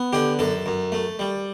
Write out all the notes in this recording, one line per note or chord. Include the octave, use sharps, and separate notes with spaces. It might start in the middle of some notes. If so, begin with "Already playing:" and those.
Already playing: B3
D3 G4
F#2 A4
F#2
A3
G3